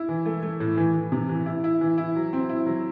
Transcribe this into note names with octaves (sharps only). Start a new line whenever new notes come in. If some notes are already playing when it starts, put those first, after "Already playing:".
Already playing: E4
E3
A3
A3
A2
E3
E3
C3
E3
E4
E4
E3
E4
F#3
C4
E4
F#3